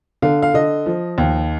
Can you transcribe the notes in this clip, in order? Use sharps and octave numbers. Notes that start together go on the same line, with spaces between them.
D3 F5
F5
D3 D#5
F3
D#2